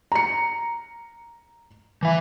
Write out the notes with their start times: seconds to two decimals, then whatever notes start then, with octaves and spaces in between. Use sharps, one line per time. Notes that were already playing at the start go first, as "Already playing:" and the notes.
0.12 A#5 C#7
2.03 E3 E5